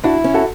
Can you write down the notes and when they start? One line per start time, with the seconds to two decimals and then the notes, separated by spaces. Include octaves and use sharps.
0.04 D4 E4 F#4
0.24 C#4
0.34 F#4 A4